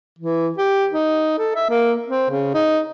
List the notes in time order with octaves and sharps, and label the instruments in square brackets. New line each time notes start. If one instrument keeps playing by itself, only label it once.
[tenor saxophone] E3
G4
D#4
A4
E5
A#3
C4
C#3
D#4